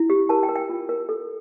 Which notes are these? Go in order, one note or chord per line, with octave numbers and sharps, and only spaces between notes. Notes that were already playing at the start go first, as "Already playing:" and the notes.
Already playing: E4
G4
A#4 A5
G5
A#4
G5
F4
A#4
A4